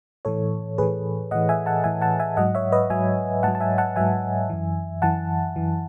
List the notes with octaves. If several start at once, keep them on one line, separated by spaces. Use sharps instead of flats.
A2 E3 A4 C#5
A2 E3 G#4 B4
A2 E3 D#5 F#5
E5 G#5
F#5 A5
A2 E3 E5 G#5
F#5 A5
E5 G#5
G#2 F#3 D#5 F#5
C#5 E5
B4 D#5
G#2 F#3 E5 G#5
G#2 F#3 F#5 A5
A5
E5 G#5
F#5 A5
G#2 F#3 E5 G#5
F#2 E3
F#2 E3 F#5 A5
F#2 E3